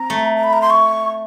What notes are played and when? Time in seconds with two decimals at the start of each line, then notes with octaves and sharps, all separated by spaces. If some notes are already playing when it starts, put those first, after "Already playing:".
Already playing: C4 A#5
0.10 A3
0.36 A#5
0.44 B5
0.53 A#5
0.62 C6
0.70 C#6